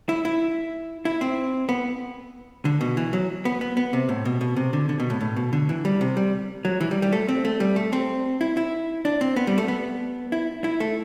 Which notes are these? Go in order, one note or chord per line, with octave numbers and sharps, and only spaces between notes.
E4
E4
E4
C4
B3
D3
B2
E3
F#3
B3
B3
B3
C3
A2
B2
B2
C3
D3
D3
B2
A2
A2
B2
D3
E3
G3
C3
G3
F#3
E3
G3
G3
A3
C4
A3
G3
A3
C4
E4
E4
D4
C4
B3
G3
A3
B3
E4
E4
A3